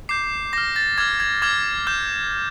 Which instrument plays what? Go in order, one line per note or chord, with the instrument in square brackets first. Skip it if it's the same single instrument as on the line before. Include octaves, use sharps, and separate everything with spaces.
[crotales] D6 G6 C7
D6 F6 A#6
A6
D6 F6 G#6
G#6
D6 F6 G#6
D6 F6 G6